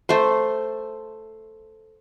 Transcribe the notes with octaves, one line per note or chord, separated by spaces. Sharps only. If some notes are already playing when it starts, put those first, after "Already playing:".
A3 C5